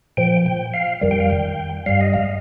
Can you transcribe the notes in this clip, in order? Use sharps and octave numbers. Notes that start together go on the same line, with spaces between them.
A#2 F3 G5
G5
F5
F2 D#3 G3
G5
F5
G5
G2 G3 F5
D#5
F5